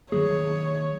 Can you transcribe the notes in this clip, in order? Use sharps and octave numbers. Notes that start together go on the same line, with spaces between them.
D#3 F#3 A#3 G#4 C#5